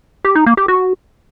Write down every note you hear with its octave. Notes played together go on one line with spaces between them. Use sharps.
G4
D#4
A#3
G4
F#4